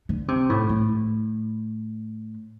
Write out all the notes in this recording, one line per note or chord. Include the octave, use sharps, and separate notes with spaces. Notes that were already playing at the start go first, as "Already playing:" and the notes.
D3
C3
A2
A2